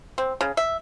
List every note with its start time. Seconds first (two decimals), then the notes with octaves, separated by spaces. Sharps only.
0.18 C4
0.41 C#3
0.57 E5